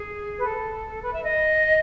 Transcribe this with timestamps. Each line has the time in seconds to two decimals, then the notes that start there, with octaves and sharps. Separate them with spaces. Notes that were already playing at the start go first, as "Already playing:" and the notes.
Already playing: G#4
0.38 B4
0.43 A4
1.03 B4
1.13 E5
1.23 D#5